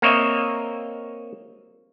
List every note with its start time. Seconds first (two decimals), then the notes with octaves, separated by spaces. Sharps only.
0.02 A#3 C4 C#5 D#5 E5